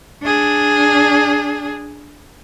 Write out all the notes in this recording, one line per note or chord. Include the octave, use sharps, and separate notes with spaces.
D4 G#4